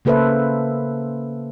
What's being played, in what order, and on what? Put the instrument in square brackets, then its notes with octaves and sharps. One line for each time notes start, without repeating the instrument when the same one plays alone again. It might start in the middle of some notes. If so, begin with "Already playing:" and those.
[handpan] C#3 A#3 A4 B4 C5 E5